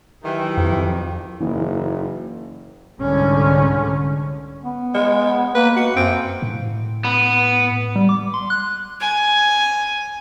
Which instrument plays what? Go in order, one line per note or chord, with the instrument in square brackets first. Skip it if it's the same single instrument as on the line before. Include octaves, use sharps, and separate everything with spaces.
[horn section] D#3 E3 [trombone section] F#3 G4
[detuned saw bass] F2
[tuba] F#1 [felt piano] E3 A#3 D#4
[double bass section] C2 G#2 D3 C#4
[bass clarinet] B3
[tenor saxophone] G#3
[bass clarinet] A#3 [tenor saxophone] B4
[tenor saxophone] F#4
[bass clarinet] F#2 [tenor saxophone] C4
[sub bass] A2
[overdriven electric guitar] B3
[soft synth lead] G3
D6
C6
F#6
[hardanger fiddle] G#5